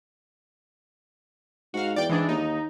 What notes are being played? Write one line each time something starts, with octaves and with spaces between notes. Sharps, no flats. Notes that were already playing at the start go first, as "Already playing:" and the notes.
G#2 F#4 F5
E2 D5 G5
G#2 E3 G#3 D4
D#2 D#4